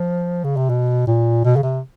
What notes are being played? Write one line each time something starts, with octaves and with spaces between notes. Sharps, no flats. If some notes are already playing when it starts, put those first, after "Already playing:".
Already playing: F3
C#3
C3
B2
A#2
B2
C#3
C3